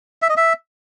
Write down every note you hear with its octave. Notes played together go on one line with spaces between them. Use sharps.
E5
D#5
E5